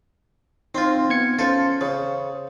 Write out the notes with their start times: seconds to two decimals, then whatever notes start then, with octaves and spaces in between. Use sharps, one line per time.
0.75 C4 D#4 F4 C6
1.10 B3 G#6 C#7
1.39 C#4 F4 A4 C5
1.81 C#3 C5